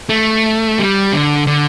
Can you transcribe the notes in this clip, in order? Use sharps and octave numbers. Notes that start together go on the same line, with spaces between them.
A3
G3
D3
D3